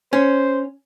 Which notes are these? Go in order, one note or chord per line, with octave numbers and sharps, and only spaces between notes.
C#4 C5